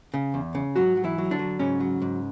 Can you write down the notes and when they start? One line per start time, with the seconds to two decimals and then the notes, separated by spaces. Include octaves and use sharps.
0.14 C#3
0.34 E2
0.55 C#3
0.76 G#2 F#3 F#4
0.97 F#3
1.04 E3 E4
1.18 F#3
1.31 D3 D4
1.39 F#3
1.59 G#2 C#3 C#4
1.80 F#3
2.02 G#2